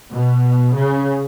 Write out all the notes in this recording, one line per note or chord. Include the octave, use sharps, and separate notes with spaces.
B2
C#3